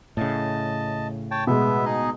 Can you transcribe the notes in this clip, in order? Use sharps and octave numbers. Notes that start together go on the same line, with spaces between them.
A2 C#3 D#5 A5
C#5 G5 A5
B2 G#3 B3 E5
D#4 G#4 D#5